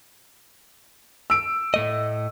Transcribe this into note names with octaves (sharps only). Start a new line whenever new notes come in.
E6 D7
A2 A3 D#5